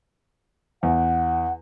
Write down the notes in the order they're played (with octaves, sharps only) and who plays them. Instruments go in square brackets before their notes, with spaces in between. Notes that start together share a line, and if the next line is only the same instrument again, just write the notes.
[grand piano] E2 [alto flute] F#5